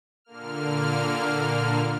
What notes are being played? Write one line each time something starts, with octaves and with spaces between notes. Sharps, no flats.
A#2 D3 A#3 F6